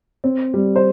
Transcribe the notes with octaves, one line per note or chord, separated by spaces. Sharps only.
C4
G3
C5